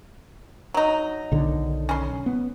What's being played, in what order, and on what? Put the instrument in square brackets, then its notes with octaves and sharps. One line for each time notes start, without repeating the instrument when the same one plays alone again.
[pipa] F#3 D#4
[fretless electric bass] B1 D3 D#3
[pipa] C#4 C6
[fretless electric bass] B3